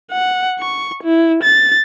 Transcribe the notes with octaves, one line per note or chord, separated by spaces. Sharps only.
F#5
C#6
E4
A6